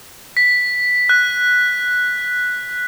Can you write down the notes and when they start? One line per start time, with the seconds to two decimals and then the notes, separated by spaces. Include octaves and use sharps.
0.37 B6
1.09 F#6